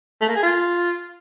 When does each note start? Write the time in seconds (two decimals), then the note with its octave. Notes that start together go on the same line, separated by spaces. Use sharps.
0.21 A3
0.28 A#3
0.35 G#4
0.43 F4